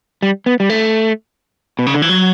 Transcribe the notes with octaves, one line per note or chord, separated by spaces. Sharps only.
G3
B3
G3
A3
B2
C#3
D3
E3
F#3